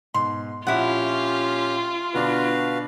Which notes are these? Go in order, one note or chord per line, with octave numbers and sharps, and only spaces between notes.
G#2 B2 C6
A#1 C#4 E4 F4 G4 F#5
B2 D3 D4 F#4 B4 F5